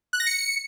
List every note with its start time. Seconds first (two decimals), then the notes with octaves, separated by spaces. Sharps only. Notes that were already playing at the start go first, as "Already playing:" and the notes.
0.13 F#6
0.20 A#6
0.27 C#7